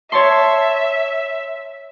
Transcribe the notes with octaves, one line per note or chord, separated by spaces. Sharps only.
C#5 E5 A5 C6